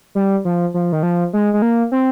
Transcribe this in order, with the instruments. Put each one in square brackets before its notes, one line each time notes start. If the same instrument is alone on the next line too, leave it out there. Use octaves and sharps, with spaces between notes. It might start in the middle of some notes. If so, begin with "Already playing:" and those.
[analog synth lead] G3
F3
F3
D#3
F3
G#3
G#3
A#3
C4